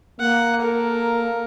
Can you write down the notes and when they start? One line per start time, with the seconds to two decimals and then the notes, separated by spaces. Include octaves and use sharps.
0.20 A#3 F#5
0.61 A4 A#4